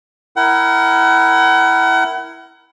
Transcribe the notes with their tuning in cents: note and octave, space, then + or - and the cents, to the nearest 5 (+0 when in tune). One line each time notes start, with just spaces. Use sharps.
E4 +0 A#4 +0 F#5 +35